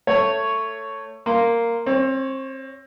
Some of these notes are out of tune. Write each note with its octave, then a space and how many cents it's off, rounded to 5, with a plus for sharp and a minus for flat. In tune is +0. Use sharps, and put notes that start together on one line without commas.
A3 +15 C#5 +0
A#3 -5 C6 +0
C4 +30 C#5 +0